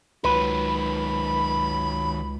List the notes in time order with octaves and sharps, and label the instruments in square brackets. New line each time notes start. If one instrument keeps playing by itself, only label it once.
[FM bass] C#2 [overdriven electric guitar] D#3 F#3 [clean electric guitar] B4 [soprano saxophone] B5